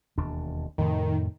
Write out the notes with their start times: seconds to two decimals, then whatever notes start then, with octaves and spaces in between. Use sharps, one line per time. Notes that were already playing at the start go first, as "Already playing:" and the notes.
0.18 E1 D#2 D4
0.78 F2 A2 C3 D#3